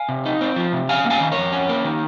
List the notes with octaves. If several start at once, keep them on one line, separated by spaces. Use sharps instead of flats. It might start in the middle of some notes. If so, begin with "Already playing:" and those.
Already playing: F5 G#5
C3
D#4
C4
F3
C3
C#4 F5 G#5
A#3
F5 G#5
D#3
A#4 C#5
F2
C#4
A#3
D#3